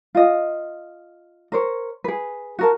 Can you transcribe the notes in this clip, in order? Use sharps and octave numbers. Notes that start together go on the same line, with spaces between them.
F4 D#5
A#4 C5 C#5
G#4 B4
F#4 A#4 A5